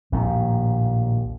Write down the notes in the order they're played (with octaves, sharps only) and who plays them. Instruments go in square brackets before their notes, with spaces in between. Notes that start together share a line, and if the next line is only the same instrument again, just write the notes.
[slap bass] A#1 D#2 A2